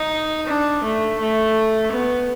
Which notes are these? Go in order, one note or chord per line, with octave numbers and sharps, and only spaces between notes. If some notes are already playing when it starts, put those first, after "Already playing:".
Already playing: D#4
D4
A3
A3
B3